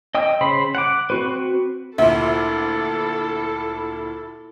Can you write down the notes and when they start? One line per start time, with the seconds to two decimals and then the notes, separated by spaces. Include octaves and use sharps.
0.15 D#5 G5 D#6 E6
0.41 C#3 C5 B5
0.75 F#5 D6
1.10 C4 F#4 B4
1.98 D2 A#2 E4 A4 E5